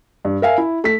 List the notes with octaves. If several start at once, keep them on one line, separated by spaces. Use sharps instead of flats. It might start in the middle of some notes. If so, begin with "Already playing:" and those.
G2
A#4 E5 F5 G#5
E4
A3 B6